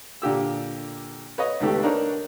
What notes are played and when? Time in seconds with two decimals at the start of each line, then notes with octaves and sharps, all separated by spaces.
0.22 A#2 D3 G4 E6
1.38 B4 C#5 D#5
1.60 C#2 D#3 A3 B3 G4
1.83 D4 D#4 A#4 B4 C#5